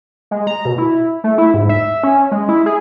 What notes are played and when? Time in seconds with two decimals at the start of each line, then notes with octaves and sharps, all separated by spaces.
0.31 G#3
0.47 A#5
0.65 B2
0.78 E4
1.24 A3
1.38 E4
1.54 G#2
1.69 E5
2.04 C#4
2.31 G#3
2.49 E4
2.66 G#4